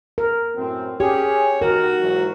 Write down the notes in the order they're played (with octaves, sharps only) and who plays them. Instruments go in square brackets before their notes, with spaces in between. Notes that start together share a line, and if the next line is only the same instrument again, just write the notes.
[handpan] A#4
[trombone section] F#2 A2 C4
[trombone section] C#4 G#4 [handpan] G4 [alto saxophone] C#5
[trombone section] D#3 [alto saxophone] F#4 [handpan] A#4
[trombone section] G#2 E3 F#3